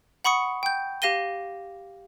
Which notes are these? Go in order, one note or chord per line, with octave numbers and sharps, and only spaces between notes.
F#5 B5 C#6 D#6 C#7
G5 G6
G4 F5 A#6 D#7 G7